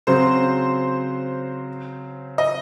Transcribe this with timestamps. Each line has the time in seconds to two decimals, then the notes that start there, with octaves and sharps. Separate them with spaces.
0.07 C#3 F#3 C4 C5
2.38 D#5